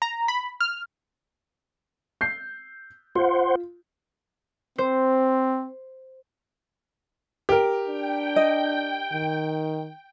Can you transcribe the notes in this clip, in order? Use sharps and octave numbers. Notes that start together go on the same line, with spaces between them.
A#5
B5
F6
G6 C7
F4 C5 F#5 C6
C4 C5
G4 A#4
D4 G5
D#5
D#3